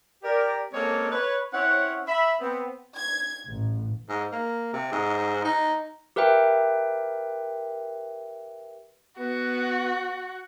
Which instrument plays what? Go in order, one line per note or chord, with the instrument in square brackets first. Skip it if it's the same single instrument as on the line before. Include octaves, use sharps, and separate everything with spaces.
[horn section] G4 A#4 D5
G#3 A#3 C4 C#4 A4 C#5
B4 C#5
C4 C#4 E4 C#5 F#5
E5 B5
B3 C4
[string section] G#6
A1
[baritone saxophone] G#2
A#3
C3
G#2
D#4
[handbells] G4 A#4 B4 E5 G5
[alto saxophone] B3 [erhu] F#4